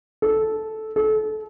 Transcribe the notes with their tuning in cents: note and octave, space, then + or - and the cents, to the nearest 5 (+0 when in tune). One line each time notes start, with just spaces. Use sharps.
A4 -10
A4 -30